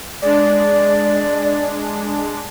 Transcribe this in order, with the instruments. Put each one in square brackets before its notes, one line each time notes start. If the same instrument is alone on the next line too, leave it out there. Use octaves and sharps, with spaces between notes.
[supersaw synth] G#3 D4 [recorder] D5